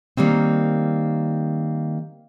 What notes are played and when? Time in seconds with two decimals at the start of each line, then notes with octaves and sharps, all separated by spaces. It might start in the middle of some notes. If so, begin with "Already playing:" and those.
0.17 D#3 G3 A#3 C4